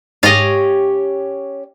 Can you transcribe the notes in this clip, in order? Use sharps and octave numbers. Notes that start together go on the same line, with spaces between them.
G#2 C#4 G4 C#5 D#5 F5 A6 D#7